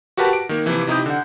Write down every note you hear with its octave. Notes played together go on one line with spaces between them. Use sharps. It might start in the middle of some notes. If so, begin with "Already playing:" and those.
F#4 G4 A#4 B4 F#5 A5
D7
D#3 A#3
C3 E3 F3
C3 D#4 E4 G4 D#6 G6
D3 F#5